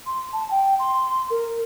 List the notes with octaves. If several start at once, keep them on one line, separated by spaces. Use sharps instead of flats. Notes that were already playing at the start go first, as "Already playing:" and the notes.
C6
A5
G5
C6
A#4